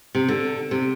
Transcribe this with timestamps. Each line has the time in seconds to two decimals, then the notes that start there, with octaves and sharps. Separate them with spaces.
0.15 C3
0.28 D3
0.71 C3